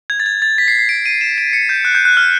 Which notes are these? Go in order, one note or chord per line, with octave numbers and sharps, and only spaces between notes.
G#6
A6
G#6
A6
B6
C7
C7
D7
D#7
E7
D7
C#7
G6
F#6
G6
F#6
F6